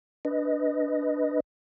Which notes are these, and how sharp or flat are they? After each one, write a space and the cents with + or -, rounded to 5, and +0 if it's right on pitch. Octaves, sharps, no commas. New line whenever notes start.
D4 +0 B4 +0 D#5 +0